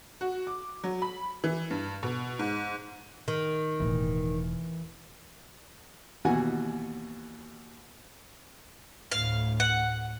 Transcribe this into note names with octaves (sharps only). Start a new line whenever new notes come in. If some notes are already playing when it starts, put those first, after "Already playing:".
F#4
D6
F#3
B5
E3
G2
B2
G#2
D#3
E1 A2 E3
D#2 B2 E3 F#4 F#5 G#5
D2 A2 F5
F#5